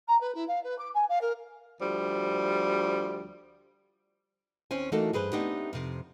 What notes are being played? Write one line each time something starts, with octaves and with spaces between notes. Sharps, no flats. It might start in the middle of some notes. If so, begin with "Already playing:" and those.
A#5
B4
E4
F5
B4
D6
G#5
F5
A#4
D2 F3 G3
D#2 C4 C#4 C5 G#5
E3 A3 A#3 D#4 F#4 A4
G2 G#4 B4 C5
A3 B3 C4 D4 D#4 G4
F2 C3